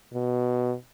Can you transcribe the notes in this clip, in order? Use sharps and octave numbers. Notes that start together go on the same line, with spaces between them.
B2